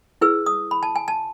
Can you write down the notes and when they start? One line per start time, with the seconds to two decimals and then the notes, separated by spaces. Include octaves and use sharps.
0.21 E4 G#4 B4 E6
0.46 D#6
0.71 B5
0.83 A5
0.96 G#5
1.08 A5